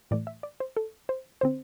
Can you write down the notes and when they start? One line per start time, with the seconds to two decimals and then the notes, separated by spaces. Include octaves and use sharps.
0.11 A2 E3 A3 D5
0.27 E5
0.43 D5
0.60 C5
0.76 A4
1.09 C5
1.41 D3 C4 C5